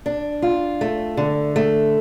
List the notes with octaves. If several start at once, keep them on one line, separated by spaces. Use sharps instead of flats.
D4
F4
A3
D3
A3